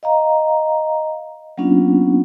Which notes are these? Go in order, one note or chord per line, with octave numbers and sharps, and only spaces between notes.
D#5 F5 A#5
F#3 A#3 B3 C#4 D4 F4